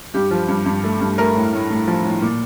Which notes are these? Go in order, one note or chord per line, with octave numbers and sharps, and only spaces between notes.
G2 G4
F3
G2
G2
A3
G2
A3 A#4
A2
A2
A2
F3
A2
A#2